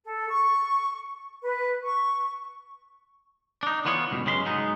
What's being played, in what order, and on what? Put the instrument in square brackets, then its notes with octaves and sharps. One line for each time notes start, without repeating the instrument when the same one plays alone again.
[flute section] A4
C#6
B4
C#6
[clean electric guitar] D4 D#4
D3 E3 B3 F4 C#5
C#2 G2 B2
F#2 C#3 G#3 B5 C6
G#2 F#3 G#3 B3 D#4